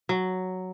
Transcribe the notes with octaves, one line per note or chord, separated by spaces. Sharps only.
F#3